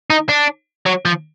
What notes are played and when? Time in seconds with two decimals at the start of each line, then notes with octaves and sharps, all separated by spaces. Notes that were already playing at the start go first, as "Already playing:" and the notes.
0.10 D#4
0.29 D4
0.86 F#3
1.05 F3